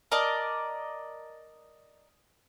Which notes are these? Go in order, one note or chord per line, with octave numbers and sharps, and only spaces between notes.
A#4 D5 D#5 A5